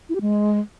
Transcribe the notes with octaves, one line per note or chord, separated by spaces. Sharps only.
E4
G4
G#3